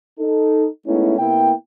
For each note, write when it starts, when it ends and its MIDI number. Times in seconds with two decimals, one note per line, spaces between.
0.19 0.67 63
0.19 0.67 69
0.86 1.16 56
0.86 1.16 57
0.86 1.16 59
0.86 1.16 61
0.86 1.16 63
0.86 1.16 64
1.19 1.52 48
1.19 1.52 58
1.19 1.52 59
1.19 1.52 64
1.19 1.52 79